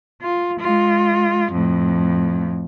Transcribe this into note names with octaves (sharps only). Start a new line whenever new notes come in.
F4
G#3 F4
F2 A2